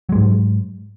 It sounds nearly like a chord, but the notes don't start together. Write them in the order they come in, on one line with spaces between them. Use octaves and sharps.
F#3 G#3 G#2